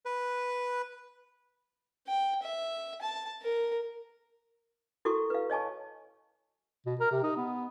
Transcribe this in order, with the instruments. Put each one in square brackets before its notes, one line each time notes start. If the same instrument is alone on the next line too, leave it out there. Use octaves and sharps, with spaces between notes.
[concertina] B4
[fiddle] G5
E5
A5
A#4
[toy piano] E4 F#4 A4 A#4 C#6
B4 F5
C#5 D#5 G#5 A5 C#6
[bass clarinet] B2
A#4
C3
D#4
B3